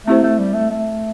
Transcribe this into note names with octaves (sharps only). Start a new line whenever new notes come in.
A3 C4 E4 G4 C5
A3
G3
A3
A3